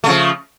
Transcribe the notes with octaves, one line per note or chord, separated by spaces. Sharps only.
C#3 F3 A3